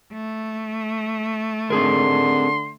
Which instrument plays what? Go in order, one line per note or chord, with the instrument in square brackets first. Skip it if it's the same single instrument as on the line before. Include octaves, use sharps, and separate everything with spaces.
[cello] A3
[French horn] D3 [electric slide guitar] C4 G#4 A#4 [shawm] C6